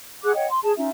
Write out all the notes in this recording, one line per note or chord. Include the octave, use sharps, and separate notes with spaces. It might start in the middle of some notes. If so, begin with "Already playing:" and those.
G#4 F#5 D6 F#6
C#5 D#5 F#5 G5
C6
G#4 A5
C#4 D#4 F4 E5